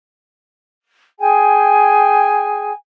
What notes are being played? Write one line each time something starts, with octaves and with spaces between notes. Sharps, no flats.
G#4 G5 G#5